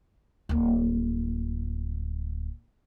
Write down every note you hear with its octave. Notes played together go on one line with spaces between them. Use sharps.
D1 A#3